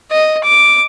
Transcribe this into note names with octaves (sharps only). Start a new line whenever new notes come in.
D#5
D6